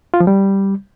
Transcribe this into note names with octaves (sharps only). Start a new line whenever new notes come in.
F4
F3
G3